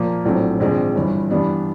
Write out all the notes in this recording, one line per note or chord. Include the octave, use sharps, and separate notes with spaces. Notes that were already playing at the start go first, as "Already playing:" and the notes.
Already playing: A#2 F3 A#3
A#1 A2 F#3 A3 C4
A#1 G#2 D#3 G#3 C4
G1 G2 E3
G2 E3 G3 B3 D4